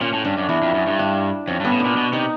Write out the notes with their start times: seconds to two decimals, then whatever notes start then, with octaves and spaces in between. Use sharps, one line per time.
0.01 A#2 C#4
0.13 A2
0.25 G2 D4
0.37 F#2
0.49 E2 E4
0.62 F2
0.74 F#2
0.87 G2
0.99 D4
1.47 F2 C#4
1.60 G2
1.65 B3
1.72 A2
1.80 D4
1.85 A#2
1.97 B2
2.13 C3 D#4